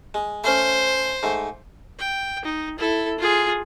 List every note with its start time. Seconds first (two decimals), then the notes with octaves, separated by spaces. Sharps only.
0.14 G#3
0.44 A3 C#4 C5
1.23 G#2 A3
1.99 G5
2.45 D#4
2.78 E4 A4
3.19 F4 G#4